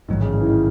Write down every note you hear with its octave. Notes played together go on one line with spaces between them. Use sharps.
A1 G#2 D#3 F#3
C#3
C#3
E3
D#3